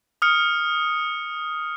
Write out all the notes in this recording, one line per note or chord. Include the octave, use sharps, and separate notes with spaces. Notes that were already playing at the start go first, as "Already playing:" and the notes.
D#6 F6 C#7